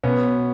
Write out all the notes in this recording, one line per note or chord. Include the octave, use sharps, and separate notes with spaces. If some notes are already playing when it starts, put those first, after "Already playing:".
B2 B3 C#4